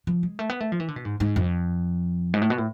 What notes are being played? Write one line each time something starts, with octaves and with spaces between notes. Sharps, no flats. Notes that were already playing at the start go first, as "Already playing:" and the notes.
F3
G#3
A3
B3
A3
F3
E3
D3
B2
G#2
G#2
F2
G#2
A2
B2
A2